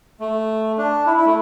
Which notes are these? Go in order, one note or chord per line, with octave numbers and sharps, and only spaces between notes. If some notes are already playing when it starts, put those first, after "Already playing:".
A3
D4
E4
E4
A3